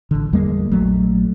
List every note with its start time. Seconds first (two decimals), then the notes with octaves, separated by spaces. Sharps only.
0.11 A1 D3
0.33 E2 G3 G#3 A#3
0.70 A#1 F#3 A3